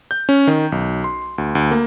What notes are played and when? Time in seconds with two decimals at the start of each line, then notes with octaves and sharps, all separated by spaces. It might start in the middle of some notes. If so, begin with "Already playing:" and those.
0.11 G6
0.29 C#4
0.47 D#3
0.72 B1
1.04 C6
1.38 D2
1.55 D2
1.71 A#3